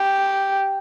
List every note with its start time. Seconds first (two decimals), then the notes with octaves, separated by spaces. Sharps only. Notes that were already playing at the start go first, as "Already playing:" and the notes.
Already playing: G4